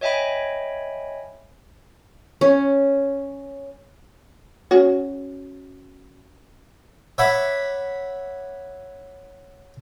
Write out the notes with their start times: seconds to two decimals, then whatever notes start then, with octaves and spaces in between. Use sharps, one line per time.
0.01 C#5 D#5 E5 G5 G#5 B5
2.41 C#4
4.71 C#4 F#4 G#4
7.18 C#5 E5 F#5 B5 D6